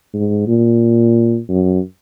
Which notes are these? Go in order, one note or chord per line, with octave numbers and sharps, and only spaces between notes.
G#2
A#2
F#2